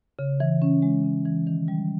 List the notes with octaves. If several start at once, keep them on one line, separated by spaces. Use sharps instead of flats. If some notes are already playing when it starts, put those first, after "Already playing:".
C#3
E3
C#4
G#3
C#3
E3
D#3
G3